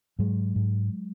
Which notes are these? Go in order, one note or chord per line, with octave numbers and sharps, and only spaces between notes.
G#2 F#3 G#3
G#2